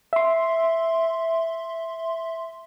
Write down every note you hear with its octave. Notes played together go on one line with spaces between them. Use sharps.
E5 C6